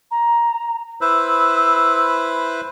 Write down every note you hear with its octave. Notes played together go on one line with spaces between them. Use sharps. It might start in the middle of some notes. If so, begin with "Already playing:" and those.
A#5
E4 B4 C5 E6